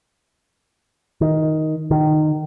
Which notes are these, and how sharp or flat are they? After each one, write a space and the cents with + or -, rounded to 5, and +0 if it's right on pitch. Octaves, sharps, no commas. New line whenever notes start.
D#3 +5
D#3 -20